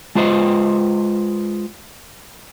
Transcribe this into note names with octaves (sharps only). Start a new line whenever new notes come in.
G#3 F4 B4 C5 D#5